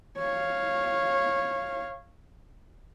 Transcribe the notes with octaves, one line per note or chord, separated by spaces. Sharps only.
C#5 F5